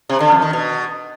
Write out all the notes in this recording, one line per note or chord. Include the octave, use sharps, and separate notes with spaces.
C3
D3
F2
D#3
B2